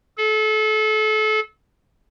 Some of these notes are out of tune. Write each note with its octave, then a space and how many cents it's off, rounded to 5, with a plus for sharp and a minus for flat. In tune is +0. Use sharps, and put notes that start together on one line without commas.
A4 -30